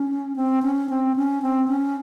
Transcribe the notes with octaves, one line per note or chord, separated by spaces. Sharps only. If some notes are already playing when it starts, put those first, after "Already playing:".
Already playing: C#4
C4
C#4
C4
C#4
C4
C#4